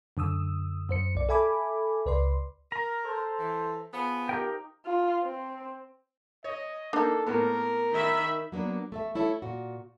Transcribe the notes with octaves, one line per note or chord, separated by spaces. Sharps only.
F#2 D3 D#6 E6
F#2 C5 C#7
B1 D5
A4 E5 G#5 B5 D6
C#2 B4 D5 C6
A#4 A#5
A4 C5
E3
F3 B3 G#4
D#4 G4 A#4 G5
F4
C4
C#5 D#5
A#3 D4 D#4 A4
A2 A#3 B3 A#4
D#3 E5 B5
F#3 A#3 B3 D4
A3 A4 E5
A3 E4 A4 C#5 E5
A#2 F#4